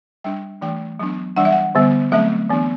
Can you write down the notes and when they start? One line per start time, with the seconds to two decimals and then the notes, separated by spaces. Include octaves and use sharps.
0.24 G3 D4 G5
0.61 E3 A3 D4 G5
0.99 F#3 B3 D4
1.36 E3 G3 D4 F#5
1.45 E5
1.52 F#5
1.75 D3 G3 B3
2.12 F#3 A3 C4 E5
2.49 E3 B3 D4